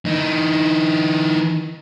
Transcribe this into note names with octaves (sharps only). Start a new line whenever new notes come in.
E3 D#4